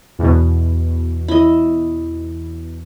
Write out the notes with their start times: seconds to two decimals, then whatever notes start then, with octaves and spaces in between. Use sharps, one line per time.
0.19 E2 B2
1.28 E4 D#5